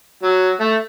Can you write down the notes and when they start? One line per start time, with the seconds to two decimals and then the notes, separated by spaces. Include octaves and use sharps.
0.23 F#3
0.60 A3